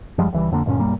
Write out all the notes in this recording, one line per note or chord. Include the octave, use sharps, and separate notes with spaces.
F#2 F3 G3 G#3
C#2 E3 G3
F2 D3 A#3
D2 G2 A#2 C#4
B1 G2 G3 A#3